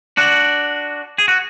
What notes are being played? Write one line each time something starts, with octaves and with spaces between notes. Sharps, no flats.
D4 F#4
G#4
F#4